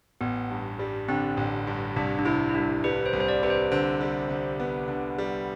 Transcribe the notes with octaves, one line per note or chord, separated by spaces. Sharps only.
A1 B3
G2
G3
D3 C4
A1
G2
C2 D4
D4
C3 E4
E4
C2 D4
G3 B4
C5
C2
C5
D5
C3 B4
C5
D3 C5
G3
D3
B3
D3
G3